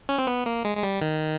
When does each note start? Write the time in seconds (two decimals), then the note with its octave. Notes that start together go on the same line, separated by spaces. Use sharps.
0.09 C#4
0.18 C4
0.27 B3
0.46 A#3
0.65 G#3
0.77 G#3
0.83 G3
1.02 D#3